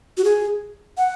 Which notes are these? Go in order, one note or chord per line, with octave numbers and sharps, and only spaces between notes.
F#4
G#4
F#5